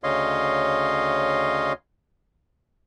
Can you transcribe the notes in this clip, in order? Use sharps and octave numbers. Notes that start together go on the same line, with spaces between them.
D2 C#3 C#5 D#5 F5 C6